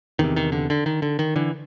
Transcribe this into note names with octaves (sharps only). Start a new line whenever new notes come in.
E2 C3 D#3
D#3
D3
D3
D#3
D3
D#3
D3 E3